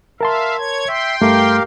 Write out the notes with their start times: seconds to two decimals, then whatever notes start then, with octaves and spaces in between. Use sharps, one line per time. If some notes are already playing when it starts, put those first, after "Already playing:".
0.21 A#4 E5 F5 A5 C6
0.59 C#5 G#6
0.88 E5 G5 C6
1.21 G2 A3 G4 A#4 F5